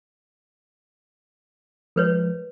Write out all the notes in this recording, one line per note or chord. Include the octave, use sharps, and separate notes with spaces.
F3 G#3 A#4 B4 C#5